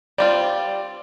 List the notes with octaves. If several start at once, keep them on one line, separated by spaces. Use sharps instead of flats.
G3 C4 F4 D5